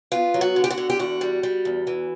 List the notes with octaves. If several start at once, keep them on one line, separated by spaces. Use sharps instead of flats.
B3 F4
F#3
F#4
D3
G4
F#4
D3
G4
E2 F#4
G3
G3
E2
E3